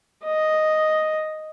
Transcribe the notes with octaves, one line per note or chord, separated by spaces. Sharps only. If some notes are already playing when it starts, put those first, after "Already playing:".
D#5